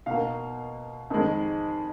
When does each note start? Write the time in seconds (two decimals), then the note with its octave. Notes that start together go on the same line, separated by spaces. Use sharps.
0.06 B2 A#3 F5
1.10 F2 D#3 G#3